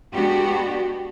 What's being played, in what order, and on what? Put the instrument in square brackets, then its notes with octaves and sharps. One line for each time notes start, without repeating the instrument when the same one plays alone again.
[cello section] G#3 B3 D4 F#4 G4